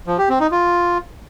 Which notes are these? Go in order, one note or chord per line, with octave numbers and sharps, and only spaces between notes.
F3
G4
C4
D#4
F4